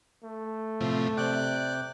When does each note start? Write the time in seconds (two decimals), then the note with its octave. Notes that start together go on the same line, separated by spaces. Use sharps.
0.24 A3
0.81 A2 C3 F3
1.17 C3 D5 G5 F#6